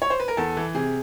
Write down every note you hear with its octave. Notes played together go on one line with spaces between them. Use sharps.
C#5
C5
B4
A#4
E2 A4
E3
C3 G#4